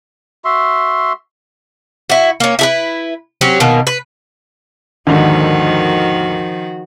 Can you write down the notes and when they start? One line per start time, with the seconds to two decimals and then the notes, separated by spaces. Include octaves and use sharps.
0.45 F#4 E5 C6
2.10 E4 F#4
2.40 A#3 C#4
2.59 E4 G#4 B4
3.41 F#3 C4 C#4 G4
3.60 B2 D#3 A#3
3.87 B4
5.07 D#2 G#2 D3 D#3 F3 F#4